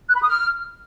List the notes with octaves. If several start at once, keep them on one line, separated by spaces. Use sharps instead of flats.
F#6
B5
D#6
F6